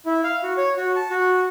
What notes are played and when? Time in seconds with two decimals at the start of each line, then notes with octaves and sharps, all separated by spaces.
0.06 E4
0.24 F5
0.43 F#4
0.57 C#5
0.77 F#4
0.96 A5
1.10 F#4